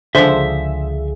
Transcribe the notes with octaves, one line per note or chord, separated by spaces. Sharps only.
C#2 D3 F3 G#4 C5 E5